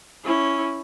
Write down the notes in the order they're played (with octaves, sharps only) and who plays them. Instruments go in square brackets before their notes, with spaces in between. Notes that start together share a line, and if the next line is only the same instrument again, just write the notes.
[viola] C#4 E4